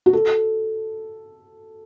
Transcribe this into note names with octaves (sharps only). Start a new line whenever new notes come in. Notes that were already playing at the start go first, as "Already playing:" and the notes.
F#4
A4